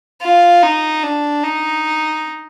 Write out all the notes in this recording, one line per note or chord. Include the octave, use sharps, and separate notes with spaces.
F4
D#4
D4
D#4